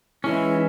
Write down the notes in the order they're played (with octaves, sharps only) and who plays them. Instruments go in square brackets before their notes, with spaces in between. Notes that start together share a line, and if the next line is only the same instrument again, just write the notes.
[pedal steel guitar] E3 G#3 C#4 [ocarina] E4